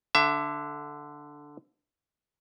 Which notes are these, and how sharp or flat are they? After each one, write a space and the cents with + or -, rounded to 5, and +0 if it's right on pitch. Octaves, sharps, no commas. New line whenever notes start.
D3 +0 E5 +25